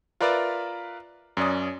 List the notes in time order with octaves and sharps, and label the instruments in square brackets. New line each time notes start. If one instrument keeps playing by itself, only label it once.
[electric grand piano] F4 A#4 B4 D5 E5
F#2 C#4 D5 D#6